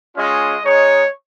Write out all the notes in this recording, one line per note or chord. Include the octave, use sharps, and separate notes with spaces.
G#3 C#4 F4 D#5
G#3 D#4 C#5